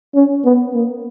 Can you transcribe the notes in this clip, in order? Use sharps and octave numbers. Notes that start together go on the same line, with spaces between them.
C#4
B3
A#3